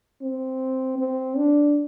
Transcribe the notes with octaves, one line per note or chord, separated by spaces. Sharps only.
C4
C4
D4